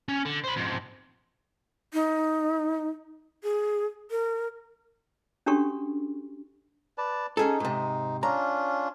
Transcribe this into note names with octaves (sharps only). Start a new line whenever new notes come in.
C#4
D3
C5 B5
F2 G#2
D#4
G#4
A#4
C#4 D4 F#4 G4 A4 C#6
B4 D5 A5
C#4 D#4 G#4 A4
G#2 C3
C#4 D4 F4 A#5